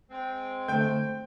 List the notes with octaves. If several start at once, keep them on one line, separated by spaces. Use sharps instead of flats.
G#3 C4
D3 A3 C5 G5 G6